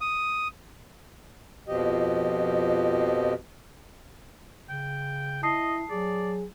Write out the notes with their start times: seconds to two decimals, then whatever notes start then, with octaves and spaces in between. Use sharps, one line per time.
0.01 D#6
1.68 F2 B2 F3 G4 D#5
4.69 C#3 G5
5.43 E4 D#5 A5 D#6 C7
5.90 F#3 G#4 D5